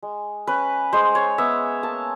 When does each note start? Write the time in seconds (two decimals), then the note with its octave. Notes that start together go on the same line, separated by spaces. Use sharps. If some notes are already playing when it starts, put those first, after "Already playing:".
0.02 G#3
0.47 C#4 B4
0.93 G#3 C5
1.15 C#5
1.38 B3 E5
1.83 A#3 A5